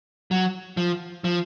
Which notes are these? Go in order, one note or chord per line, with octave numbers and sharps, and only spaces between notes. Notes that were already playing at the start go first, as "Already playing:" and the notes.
F#3
F3
F3